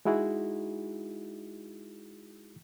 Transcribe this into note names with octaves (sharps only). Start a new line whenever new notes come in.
G#3 D#4 E4 F#4 G#4